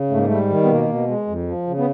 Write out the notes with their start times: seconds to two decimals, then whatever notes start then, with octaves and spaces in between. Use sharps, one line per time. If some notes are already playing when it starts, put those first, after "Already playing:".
Already playing: C#3
0.10 G#2 A3
0.18 A#3
0.26 G3 A3
0.49 D#3
0.64 B3
0.69 B2 A#3
0.89 B2
1.08 G#3
1.28 F2
1.47 F3
1.67 C#3
1.78 B3